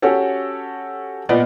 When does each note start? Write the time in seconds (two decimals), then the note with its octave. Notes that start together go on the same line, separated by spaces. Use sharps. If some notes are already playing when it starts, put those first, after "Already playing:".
0.02 C#4 F#4 G4 A4 C#5
1.29 A#2 B3 D5 D#5 B5